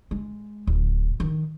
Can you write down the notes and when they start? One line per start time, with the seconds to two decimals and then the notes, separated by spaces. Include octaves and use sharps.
0.11 G#3
0.67 D1
1.20 D#3